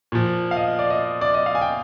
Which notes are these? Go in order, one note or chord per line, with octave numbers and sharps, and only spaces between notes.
A#2 F3
F5
D#5
D#5
D5
D#5
D5
D#5
F5
G#5
G5